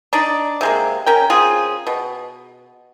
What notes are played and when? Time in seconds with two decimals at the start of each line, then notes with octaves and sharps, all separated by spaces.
0.13 D4 D#4 D5
0.61 C3 G#3 A#3
1.06 C#4 A#4 G5
1.30 C#3 C4 F4 G#4
1.87 B2